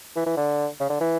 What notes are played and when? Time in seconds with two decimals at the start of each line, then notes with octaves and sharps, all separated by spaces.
0.16 E3
0.26 E3
0.37 D3
0.80 C#3
0.90 D3
1.00 E3